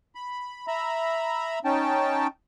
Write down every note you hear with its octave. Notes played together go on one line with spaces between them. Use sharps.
B5
E5 A#5 B5
C#4 D#4 G5 A5